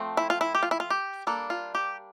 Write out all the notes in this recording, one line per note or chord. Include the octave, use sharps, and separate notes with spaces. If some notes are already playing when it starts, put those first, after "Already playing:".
Already playing: F3 A3 C4
E4
F4
E4
G4
F4
E4
F4
G4
G3 A#3 D4 A4
F4
G4